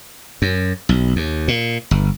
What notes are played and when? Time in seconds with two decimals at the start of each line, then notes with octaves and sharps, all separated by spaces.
0.42 F#2
0.89 B1
1.16 D#2
1.48 A#2
1.91 G1